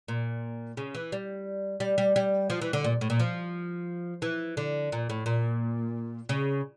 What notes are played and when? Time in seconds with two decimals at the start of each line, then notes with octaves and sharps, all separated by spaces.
0.08 A#2
0.77 C#3
0.95 E3
1.12 G3
1.80 G3
1.98 G3
2.16 G3
2.50 F3
2.62 E3
2.73 D3
2.84 A#2
3.01 A2
3.10 A#2
3.20 F3
4.22 E3
4.57 D3
4.92 A#2
5.10 A2
5.26 A#2
6.29 C#3